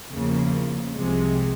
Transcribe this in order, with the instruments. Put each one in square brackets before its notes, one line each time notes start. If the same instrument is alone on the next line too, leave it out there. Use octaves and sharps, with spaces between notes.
[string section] E2 C#3 F3 A#3
C2 C3 F3 G#3